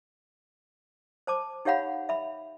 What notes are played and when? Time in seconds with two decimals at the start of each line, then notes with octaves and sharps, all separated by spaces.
1.27 C5 A5 D6
1.65 D#4 G4 C#5 F5 F#5 B5
2.09 E5 B5